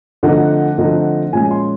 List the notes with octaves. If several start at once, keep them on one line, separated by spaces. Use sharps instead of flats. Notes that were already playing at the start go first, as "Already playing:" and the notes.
D3 F3 A3 C4 D#4 F#5
D3 F3 A3 C4 D#4
A#2 F3 G#3 C#4 G#5
C6